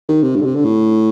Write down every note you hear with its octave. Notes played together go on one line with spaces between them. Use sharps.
D#3
C3
G2
D3
C3
D3
A2